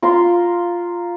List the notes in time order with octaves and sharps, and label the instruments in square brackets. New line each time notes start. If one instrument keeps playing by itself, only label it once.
[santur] F4 A#4 F5 C6